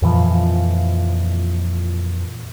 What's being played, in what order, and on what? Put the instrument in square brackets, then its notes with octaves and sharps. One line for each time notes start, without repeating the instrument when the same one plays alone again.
[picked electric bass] F2 A#2 E3 F3